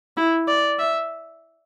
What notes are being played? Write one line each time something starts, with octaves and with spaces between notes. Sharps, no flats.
E4
D5
E5